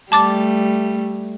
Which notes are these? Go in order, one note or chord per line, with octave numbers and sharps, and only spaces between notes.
G3 A3 A5 D6 A6